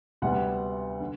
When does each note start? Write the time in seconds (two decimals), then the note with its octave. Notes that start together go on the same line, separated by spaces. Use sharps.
0.22 D2 C3 G3 B3 F#5
1.00 D3